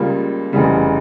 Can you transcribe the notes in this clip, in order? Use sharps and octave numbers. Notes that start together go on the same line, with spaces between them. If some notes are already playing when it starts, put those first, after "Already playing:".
Already playing: C#2 C#3 G3 A#3 F4
F1 E2 C#3 G3